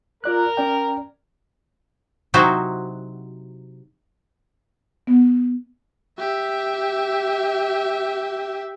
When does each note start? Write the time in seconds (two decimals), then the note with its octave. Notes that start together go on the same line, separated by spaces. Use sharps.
0.24 F4 A#4 D5 F#6
0.57 C#4 D5 G5
2.34 C3 F#3 D#4 E4 F#4 C5
5.07 B3
6.19 G4 E5